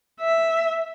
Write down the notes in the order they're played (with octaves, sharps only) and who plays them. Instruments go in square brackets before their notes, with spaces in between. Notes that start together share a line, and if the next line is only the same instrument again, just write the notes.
[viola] E5